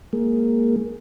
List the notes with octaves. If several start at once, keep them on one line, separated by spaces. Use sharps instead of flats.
G#3 A#3